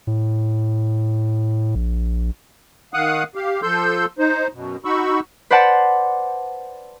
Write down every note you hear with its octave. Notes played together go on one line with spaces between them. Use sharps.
A2
A#1
D#3 F5 F#5 D#6 F#6
G4 F5
F3 A4 C6 E6 G6
D#4 C5
F#2 B2
D#4 F#4 B5 C#6 E6
B4 C5 D5 F#5 A5